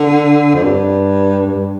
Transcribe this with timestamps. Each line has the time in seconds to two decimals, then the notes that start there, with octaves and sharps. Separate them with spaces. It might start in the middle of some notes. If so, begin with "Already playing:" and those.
Already playing: D3
0.54 F2
0.63 G2
1.46 G2